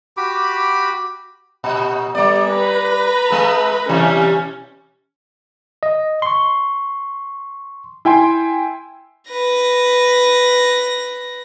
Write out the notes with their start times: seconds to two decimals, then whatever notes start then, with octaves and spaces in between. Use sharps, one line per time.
0.17 F#4 G4 B5 D6
1.64 A#2
2.15 G3 B3 D5
2.50 B4 A#5
3.30 G#3 A4
3.89 B2 E3 G3 C#4
5.83 D#5
6.22 C6 C#6
8.05 E4 G5 G#5 C6
9.31 B4 A#6